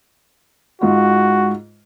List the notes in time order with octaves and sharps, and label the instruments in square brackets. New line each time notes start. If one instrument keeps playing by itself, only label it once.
[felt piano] G#2 F4 [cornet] F#4